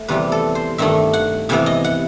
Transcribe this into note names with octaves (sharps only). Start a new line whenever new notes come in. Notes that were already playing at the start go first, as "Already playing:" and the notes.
Already playing: A3
E2 C3 E3 G3 B4
A4
C5
G2 D#3 A3 D#4 E5
F#5
C3 E3 B3 E5
D#5
F#5